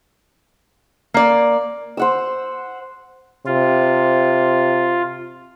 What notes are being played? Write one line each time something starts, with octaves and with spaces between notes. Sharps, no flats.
A#3 D5
C5 F#5 E6
C3 F4